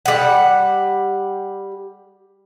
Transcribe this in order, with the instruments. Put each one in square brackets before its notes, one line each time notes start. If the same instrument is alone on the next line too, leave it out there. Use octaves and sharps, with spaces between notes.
[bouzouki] G3 F#5